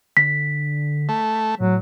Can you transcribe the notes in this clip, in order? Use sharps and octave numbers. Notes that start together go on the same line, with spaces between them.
D3 B6
A3
A2 F#3